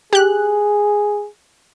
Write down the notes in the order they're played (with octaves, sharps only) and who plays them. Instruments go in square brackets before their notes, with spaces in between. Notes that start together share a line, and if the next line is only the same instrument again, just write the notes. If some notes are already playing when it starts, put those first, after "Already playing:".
[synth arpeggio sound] G4 F#6 [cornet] G#4